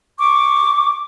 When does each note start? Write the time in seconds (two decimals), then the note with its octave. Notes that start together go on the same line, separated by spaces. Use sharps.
0.18 C#6 D6